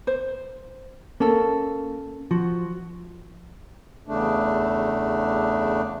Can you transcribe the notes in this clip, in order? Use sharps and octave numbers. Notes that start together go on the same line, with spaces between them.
C5
A#3 C#4 A4
F3 F#4
E2 C#3 A3 D4